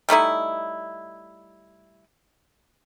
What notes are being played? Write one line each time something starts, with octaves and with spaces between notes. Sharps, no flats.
G3 A3 D#4 E4